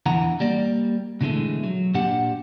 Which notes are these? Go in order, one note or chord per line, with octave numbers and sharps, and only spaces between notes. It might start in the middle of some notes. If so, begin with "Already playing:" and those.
E2 D3 E3 F#5 A#5
G3 A#3 D5
B2 D3 E3 F3 G#3 A3
F#3
A#2 D4 G4 F#5